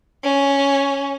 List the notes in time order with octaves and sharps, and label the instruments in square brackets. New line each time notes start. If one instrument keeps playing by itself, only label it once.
[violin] C#4